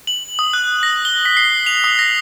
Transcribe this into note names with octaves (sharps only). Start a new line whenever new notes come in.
F#7
D#6
F#6
A#6
G7
B6
C7
F7
D#6
A#6